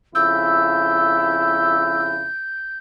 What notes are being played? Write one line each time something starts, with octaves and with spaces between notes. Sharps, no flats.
F2 C#3 E4 E6 G6